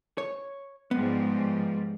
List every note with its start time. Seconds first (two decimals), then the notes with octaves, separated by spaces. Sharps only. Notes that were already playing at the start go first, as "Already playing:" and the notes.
0.18 C#5
0.91 G#2 F3 G3 B3